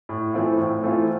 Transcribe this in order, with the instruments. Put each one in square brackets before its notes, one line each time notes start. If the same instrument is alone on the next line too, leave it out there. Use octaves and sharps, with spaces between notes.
[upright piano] A2
E3 A3 C4 F4
A2
E3 A3 C4 F4